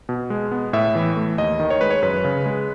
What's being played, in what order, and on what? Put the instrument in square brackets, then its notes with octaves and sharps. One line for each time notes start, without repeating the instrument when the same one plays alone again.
[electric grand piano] B2
G#3
B3
A2 E5
E3
A3
D#2 D#5
D#3
C#5
G#3 B4
C#5
F#2 B4
C#3
G#3